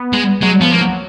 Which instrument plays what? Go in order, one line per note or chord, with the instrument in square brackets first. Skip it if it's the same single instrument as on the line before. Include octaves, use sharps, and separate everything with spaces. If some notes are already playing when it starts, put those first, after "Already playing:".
Already playing: [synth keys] B3
[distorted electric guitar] G#3
[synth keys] F#3 [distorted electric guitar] G#3
[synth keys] F3 [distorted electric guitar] B3
[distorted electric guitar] A#3
[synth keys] F#3